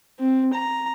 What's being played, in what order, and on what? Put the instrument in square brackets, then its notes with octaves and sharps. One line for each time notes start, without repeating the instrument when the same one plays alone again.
[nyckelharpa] C4
A#5